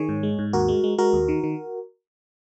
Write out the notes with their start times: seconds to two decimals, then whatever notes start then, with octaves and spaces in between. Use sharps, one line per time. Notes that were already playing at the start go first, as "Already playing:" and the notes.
Already playing: D#3 G#4 C#5
0.09 G#2
0.23 G#3
0.39 G#2
0.53 D#2 F#4 A#4
0.68 G#3
0.84 G#3
0.98 G#3 F#4 A#4
1.13 D#2
1.28 D#3
1.44 D#3